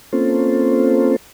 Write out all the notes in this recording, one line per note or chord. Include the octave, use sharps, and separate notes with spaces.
A#3 C4 C#4 F4 A4 C5